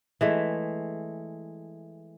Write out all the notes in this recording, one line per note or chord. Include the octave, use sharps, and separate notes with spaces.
E3 G#3 A3